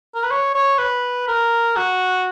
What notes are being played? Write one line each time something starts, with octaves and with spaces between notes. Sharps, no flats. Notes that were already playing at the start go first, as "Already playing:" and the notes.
A#4
B4
C#5
C#5
B4
A#4
F#4